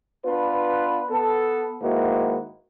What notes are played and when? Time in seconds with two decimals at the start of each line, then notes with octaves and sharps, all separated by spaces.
0.24 B3 D4 F4 B4
1.10 B3 A4
1.82 G#2 D#3 A#3 E4 F#4 B4